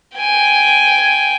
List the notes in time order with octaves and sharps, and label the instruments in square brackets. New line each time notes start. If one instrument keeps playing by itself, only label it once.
[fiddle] G5 G#5